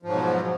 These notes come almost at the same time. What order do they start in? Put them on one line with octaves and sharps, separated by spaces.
F3 G#2 F#3 B2